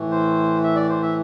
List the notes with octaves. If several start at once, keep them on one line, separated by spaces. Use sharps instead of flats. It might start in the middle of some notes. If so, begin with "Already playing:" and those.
Already playing: A2 E3
C5
E5
D5
C5
E5